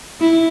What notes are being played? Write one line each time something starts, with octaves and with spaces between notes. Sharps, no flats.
E4